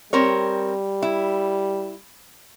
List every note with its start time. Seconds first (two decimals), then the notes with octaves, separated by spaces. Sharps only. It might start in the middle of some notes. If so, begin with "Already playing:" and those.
0.13 G3 C4 A#4 C#5
1.02 E4